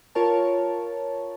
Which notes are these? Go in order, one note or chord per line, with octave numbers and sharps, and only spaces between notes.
F4 A#4 C#5 A5